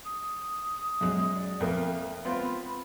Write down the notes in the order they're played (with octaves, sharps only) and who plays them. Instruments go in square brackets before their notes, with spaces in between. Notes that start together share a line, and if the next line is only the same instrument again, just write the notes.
[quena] D#6
[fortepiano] F#2 G#3
[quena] D5
[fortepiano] F2 A#3 [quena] E5
[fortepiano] B3 C4 F4 [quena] B5